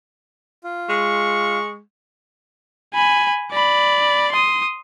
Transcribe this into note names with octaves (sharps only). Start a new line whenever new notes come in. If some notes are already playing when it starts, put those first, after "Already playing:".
F4
G#3 C#6
G#5 B5
D5 B5
C6 D#6